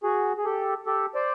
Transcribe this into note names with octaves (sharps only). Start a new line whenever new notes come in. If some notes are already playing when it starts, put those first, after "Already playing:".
F#4 G#4
G#4
G4 A4
G4 A4
C5 D5